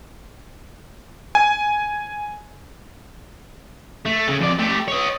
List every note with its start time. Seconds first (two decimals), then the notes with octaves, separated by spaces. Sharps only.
1.35 G#5
4.06 A3
4.29 C#3
4.40 F2 D5
4.59 A3 G4
4.88 C#5 D#5